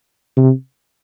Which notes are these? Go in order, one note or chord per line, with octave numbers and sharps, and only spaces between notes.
C3